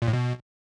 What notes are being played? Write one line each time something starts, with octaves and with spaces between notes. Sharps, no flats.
A#2
A2
B2